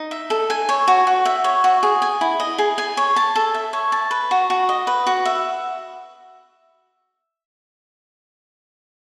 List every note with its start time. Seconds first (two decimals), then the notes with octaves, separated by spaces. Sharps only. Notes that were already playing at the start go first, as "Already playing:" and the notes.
Already playing: D#4
0.11 E5
0.30 A4
0.50 G#5
0.69 C#5
0.88 F#4
1.07 F#4
1.25 E5
1.44 C#5
1.64 F#4
1.83 G#4
2.02 G#5
2.21 E4
2.40 D#5
2.58 G#4
2.78 G#5
2.97 C#5
3.16 A5
3.36 A4
3.54 E5
3.73 C#5
3.92 A5
4.11 B4
4.31 F#4
4.50 F#4
4.69 D#5
4.87 B4
5.07 F#4
5.25 E5